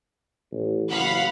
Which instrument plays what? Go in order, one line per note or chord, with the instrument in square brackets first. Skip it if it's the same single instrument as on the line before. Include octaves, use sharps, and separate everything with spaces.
[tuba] A1
[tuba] F#1 [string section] F5 F#5 B5